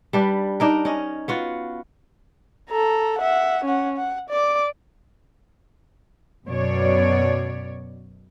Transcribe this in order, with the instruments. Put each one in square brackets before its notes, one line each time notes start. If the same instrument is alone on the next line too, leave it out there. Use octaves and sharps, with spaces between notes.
[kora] G3 D4 B4
D4 D#4 A#4
C#4 D#5
B3 F4 F#4
[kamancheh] A4 A#5
E5 F#5
C#4 F#5
F#5
D5 D6
[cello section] F#2 B2 C#5 D5